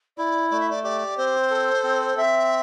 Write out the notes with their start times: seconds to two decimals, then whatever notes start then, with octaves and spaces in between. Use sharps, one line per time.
0.17 E4 D5
0.50 A3 D5
0.60 E5
0.70 D5
0.84 G4 D5
1.17 C4 C5
1.50 A4
1.83 C4
2.17 C4 E5